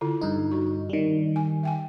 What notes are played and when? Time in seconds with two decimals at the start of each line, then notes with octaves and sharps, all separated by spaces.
0.01 D3 E4 F4
0.21 G2 D#4
0.51 F#4
0.90 D#3 G3
1.36 G#5
1.63 E5 G5 G#5